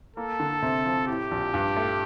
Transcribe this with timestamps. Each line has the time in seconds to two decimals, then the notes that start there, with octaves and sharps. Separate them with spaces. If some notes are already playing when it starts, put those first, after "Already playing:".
0.16 A#3 A4
0.40 D3
0.62 C3
0.85 F3
1.07 A2 G4
1.31 A#1
1.54 G2
1.77 A3